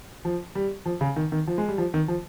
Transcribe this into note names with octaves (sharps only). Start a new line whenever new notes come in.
F3
G3
F3
C#3
D#3
D#3
F3
G#3
G3
F3
D#3
F3